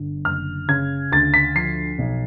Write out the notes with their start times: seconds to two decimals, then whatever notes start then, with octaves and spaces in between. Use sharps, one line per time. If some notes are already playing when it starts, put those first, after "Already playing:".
Already playing: G1 D3
0.25 F#1 F6
0.68 C#3 G#6
1.12 D2 A6
1.34 B6
1.55 F3 C7
1.99 B1